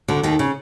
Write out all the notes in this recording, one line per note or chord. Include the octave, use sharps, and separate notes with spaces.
D2 D3
D#2 D#3
C#3